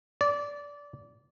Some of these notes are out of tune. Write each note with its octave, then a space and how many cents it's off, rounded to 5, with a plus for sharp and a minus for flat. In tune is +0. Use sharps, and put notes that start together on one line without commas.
D5 -20